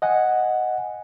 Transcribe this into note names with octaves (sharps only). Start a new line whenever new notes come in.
D#5 F#5 G#5